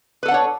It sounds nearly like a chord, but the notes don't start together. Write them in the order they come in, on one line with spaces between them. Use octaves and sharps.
B4 A4 F#5 D4 C#5